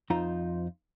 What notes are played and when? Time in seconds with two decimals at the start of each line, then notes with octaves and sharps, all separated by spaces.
0.10 F2 D#4 F4 C5 A#5